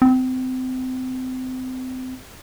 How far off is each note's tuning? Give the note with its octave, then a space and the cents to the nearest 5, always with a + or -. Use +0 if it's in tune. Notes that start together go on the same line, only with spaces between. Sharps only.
C4 -30